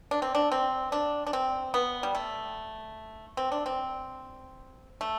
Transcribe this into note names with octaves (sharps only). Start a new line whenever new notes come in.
D4
C4
D4
C4
D4
D4
C4
B3
G3
A3
C4
D4
C4
A3